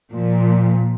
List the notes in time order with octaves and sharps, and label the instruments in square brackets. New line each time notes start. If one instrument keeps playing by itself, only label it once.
[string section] A#2 F3